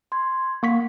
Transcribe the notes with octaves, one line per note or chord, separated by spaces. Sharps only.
C6 G#6
A#3 F#5 C#6 B6